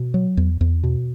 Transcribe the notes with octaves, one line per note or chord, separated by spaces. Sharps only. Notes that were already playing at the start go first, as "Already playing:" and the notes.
Already playing: B2
F#3
E2
E2
B2